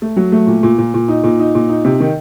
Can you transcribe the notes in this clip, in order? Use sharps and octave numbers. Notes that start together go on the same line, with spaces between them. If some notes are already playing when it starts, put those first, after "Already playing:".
A3
F#3
A3
A#2
A#2
A#2
A#2
D#4
A#2
D#4
A#2
D#4
C3
D#3